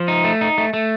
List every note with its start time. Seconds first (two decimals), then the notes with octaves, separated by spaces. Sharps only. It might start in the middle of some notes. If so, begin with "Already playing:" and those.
Already playing: F3
0.08 D#4
0.24 A3
0.41 D#4
0.58 A3
0.74 A3